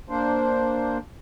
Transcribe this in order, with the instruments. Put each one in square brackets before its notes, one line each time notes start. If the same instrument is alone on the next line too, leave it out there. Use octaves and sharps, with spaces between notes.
[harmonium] A#3 D4 C5